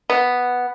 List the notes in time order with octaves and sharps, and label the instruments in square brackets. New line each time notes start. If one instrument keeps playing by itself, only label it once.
[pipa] B3